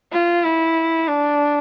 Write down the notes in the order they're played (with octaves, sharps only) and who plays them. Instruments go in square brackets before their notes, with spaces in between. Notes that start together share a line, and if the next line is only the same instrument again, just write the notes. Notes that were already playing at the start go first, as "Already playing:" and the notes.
[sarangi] F4
E4
D4